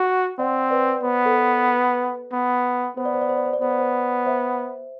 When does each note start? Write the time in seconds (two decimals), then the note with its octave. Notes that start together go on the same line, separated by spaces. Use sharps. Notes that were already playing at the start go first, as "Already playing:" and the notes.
Already playing: F#4
0.39 C4 D5 F#5
0.71 B4 D5
1.03 B3 C5
1.26 A4
1.36 B4
2.33 B3
2.97 B3 C5
3.05 D5
3.14 C5
3.21 D5
3.29 C5
3.37 D5
3.45 C5
3.53 D5
3.62 B3 C5
3.71 D5
3.79 C5
4.26 C5 E5